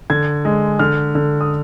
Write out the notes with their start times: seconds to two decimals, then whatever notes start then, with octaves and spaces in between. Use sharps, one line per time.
0.10 D3 G#6
0.45 G#3
0.79 D3 F6
1.15 D3
1.41 D#6